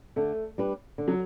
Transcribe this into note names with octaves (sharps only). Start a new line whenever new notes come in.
D3 A3
G3 D4 G4 B4
D3
F#3